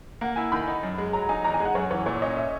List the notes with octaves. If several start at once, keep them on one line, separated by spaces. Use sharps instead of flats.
A#3 F#5
E4 G#5
D#3 B5
D#4
F#2
G#3
F#3 A#5
D#4 G#5
E2 A#5
G#5
G#3
F#5
F#2 C#5
E3 C#5
A#2 C#5
C#4 D#5
E5